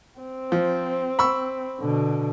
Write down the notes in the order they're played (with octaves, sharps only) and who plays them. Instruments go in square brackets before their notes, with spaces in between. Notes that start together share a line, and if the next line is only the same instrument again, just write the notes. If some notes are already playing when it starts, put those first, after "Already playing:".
[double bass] C4
[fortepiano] F3
B5 C#6 E6
[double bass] B2 D3